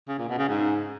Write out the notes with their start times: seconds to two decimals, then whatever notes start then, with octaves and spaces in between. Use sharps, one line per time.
0.08 C#3
0.18 A#2
0.29 B2
0.39 C#3
0.49 G#2